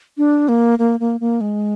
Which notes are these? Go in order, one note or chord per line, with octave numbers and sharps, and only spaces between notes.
D4
A#3
A#3
A#3
A#3
G#3